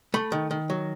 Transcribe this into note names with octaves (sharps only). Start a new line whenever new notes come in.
A3 B5
D#3
D#3
F#3